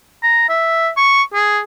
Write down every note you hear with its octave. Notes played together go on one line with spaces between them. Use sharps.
A#5
E5
C#6
G#4